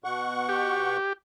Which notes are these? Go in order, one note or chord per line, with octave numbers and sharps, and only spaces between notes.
B2 F#5 C#6
G4